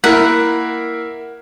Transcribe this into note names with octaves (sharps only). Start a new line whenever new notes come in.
A#3 E4 A#4 F#5